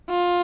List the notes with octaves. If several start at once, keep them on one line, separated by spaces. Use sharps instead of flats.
F4